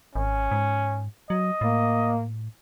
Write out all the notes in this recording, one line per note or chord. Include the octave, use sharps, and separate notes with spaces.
G#1 C#4
G#2
F#3 D#5
A2 A#3